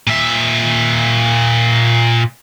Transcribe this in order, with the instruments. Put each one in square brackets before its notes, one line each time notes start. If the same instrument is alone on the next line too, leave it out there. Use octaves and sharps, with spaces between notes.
[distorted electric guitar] A#2 E5